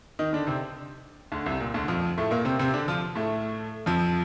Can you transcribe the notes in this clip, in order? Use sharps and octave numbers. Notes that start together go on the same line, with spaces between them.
D#3 D#4
D3 D4
C3 C4
D2 D3
C2 C3
A#2
D2 D3
F2 F3
A2 A3
A#2 A#3
C3 C4
C3 C4
D3 D4
F3 F4
A2 A3
F2 F3